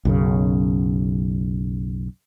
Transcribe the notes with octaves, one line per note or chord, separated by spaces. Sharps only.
B1 F#2 C#3